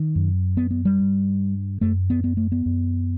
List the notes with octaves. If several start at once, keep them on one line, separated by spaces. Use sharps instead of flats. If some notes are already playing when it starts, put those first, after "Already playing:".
Already playing: D#3
F#2
B3
B3
G3
G2
F#2 A3
B3
B3
A3
B3
F#2